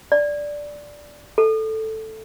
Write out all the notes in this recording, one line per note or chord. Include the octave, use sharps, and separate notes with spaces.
D5
A4